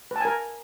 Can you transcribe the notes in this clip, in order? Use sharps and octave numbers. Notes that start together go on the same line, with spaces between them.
A#4 B4 G#5 A5